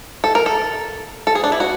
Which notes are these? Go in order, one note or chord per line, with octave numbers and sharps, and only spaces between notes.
A4
A#4
A4
A4
G#4
D4
E4
F#4